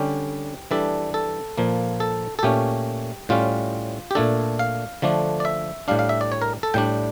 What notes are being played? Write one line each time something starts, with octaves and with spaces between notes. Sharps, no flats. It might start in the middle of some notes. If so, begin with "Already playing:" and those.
Already playing: D3 G3 C#4 G4
E3 G3 D4 A4
A4
A#2 F3 A#3
A4
A4
A#2 A3 C#4 G4
A2 G3 C#4 F4
G4
A#2 A3 D4 A4
F5
D3 F3 A3 D4
D5
E5
A2 G3 D4 F5
F5
E5
D5
C#5
A#4
A4
A2 G3 D4 G5